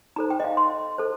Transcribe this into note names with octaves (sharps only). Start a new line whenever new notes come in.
D#4 A4 C5 A#5
G5
D#5
F5
C6
A4 C5